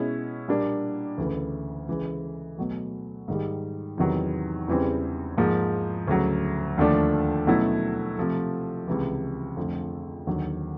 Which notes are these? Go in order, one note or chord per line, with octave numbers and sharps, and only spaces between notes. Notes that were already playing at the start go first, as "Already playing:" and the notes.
Already playing: B2 G#3 C#4 E4
A#2 G3 A#3 D4
D2 C#3 E3
C#3 E3 G#3
B2 F#3 A3
G#2 D#3 G3
E2 C3 D#3 F#3 B3
E2 C#3 E3 G3 C4
G#2 F3 A#3
D2 C#3 F#3
D#2 D3 F3 A3 D4
B2 F#3 A3 C#4 E4
C3 F3 A3
C#2 C3 E3
F2 D3 F3 A3
D#2 D3 F#3